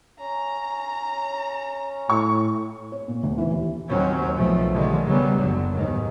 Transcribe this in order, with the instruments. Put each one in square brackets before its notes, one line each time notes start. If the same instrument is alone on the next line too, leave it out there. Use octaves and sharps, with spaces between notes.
[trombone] C#4 [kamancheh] A#5
[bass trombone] A2 [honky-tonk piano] C#6
[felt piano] C#5
A#2
D2
E3
D#2
[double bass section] D#2 F#3 C4 C#4
B1 B2 F3 A3
D3 D#3 G3 G#3
C#3 F#3 G3 B3
F#1 D3 F#3
D#2 G#2 B2 D#3